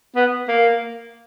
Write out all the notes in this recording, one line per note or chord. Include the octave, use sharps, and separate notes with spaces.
B3
A#3